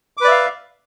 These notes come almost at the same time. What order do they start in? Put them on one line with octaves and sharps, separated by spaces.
D6 B4 D5 E5 F5